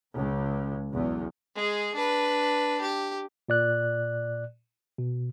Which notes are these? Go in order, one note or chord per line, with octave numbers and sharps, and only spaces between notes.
C#2
B1 E2
G#3 G#4
D4 B4
G4
A#2 D5 F#6
B2